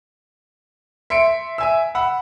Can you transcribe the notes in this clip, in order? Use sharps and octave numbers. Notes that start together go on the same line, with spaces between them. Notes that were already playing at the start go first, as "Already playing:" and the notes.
E5 C6 C#7 D7
E5 G#5 E6
F#5 B5 E6